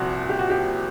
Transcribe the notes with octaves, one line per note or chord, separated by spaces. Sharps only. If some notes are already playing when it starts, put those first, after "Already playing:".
Already playing: C2 A#2 F3 F#4
G4
F#4
G4